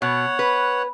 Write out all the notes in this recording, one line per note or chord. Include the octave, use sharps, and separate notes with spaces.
B2 C#5 F#5
B4